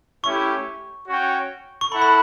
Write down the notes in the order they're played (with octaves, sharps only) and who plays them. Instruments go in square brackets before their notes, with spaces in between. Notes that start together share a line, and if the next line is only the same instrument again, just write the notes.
[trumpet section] A3 C#4 E4 G4 [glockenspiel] C#6
[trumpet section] C#4 F#4 C#5 G5
[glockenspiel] C#6
[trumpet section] E4 A4 F#5 [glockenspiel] B5
[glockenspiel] B5